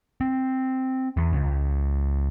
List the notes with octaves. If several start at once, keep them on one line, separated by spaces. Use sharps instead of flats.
C4
E2
C#2